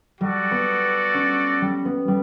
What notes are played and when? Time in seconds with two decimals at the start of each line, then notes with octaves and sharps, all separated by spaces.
0.20 G3 F#4 A4 D5
0.51 B3
1.14 C#4
1.62 G3
1.85 B3
2.08 G3